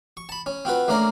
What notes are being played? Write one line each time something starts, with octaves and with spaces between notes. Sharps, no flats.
C#6
A5 B5
C#4
C4 F4 F#4 B4
A3 A#3 C#4 D4 A#4